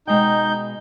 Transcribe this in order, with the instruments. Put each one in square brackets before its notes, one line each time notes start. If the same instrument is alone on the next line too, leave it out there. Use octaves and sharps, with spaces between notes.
[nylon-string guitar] B2 G#3 G5 [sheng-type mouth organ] D#4 G6